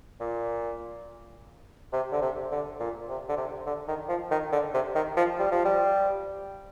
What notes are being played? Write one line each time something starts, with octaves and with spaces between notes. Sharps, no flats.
A#2
C3
D3
C3
D3
A#2
C3
D3
C3
D3
D#3
F3
D#3
D3
C3
D#3
F3
G3
F3
G3